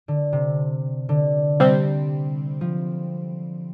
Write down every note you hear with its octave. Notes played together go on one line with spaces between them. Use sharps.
D3
C3
D3
C3 G3 C4
F3